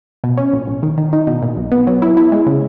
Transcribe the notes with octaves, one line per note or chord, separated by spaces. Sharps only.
B2
C#4
A#1
A#1
D#3
D#3
D#4
B2
A#2
B1
B3
F#3
E4
E4
G#3
C#3